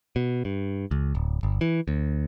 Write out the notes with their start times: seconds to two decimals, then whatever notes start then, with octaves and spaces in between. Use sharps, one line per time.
0.16 B2
0.45 G2
0.91 C#2
1.15 D1
1.43 G1
1.61 E3
1.88 D2